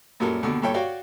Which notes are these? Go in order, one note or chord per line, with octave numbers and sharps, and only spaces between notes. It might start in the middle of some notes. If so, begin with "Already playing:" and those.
F#2 A#2 F#3 G3 A4 A#4
D#2 B2 D3
G2 A#2 G4 A4 C#5 G5
F#4 C#5 D5 F5 G5